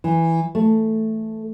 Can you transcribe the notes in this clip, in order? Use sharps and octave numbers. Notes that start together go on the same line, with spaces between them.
E3
A3